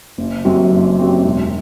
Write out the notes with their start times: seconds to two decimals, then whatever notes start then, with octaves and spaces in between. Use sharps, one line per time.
0.18 F#1
0.45 F#2 F#3 C4 G4
0.72 F#1
0.98 F#2 F#3 C4 G4
1.25 E1